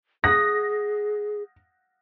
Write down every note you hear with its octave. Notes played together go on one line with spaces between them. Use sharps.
G#4 F#5 D#6 A#6